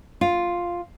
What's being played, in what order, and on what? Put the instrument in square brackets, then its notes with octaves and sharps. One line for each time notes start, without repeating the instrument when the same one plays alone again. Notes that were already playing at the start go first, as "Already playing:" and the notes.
[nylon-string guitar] F4